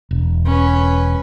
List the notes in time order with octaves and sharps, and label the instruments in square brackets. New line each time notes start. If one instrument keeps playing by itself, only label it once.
[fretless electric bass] E1
[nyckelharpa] C#4 B4